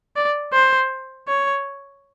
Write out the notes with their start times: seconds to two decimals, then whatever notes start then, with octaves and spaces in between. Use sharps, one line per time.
0.16 D5
0.53 C5
1.28 C#5